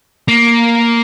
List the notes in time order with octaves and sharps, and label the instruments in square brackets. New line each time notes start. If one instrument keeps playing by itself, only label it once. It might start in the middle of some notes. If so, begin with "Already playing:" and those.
[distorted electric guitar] A#3